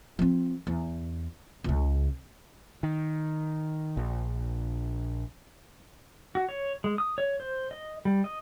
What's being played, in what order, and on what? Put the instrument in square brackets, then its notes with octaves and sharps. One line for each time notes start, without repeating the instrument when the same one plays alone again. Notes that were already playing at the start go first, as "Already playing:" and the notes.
[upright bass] F3 C4
E2
C#2 C#3
[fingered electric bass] D#3
A#1
[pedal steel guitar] F#4
C#5
G#3
D#6
C#5
C5
D#5
G3
D#5